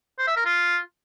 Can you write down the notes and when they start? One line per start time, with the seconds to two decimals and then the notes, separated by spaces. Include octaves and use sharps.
0.19 C5
0.27 E5
0.36 A#4
0.45 F4